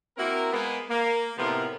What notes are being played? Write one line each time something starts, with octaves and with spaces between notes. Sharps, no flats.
A#3 C4 E4 F#4 A#4
G#3 A#3 B3
A#3
A2 C3 F3 B3 F4 A#4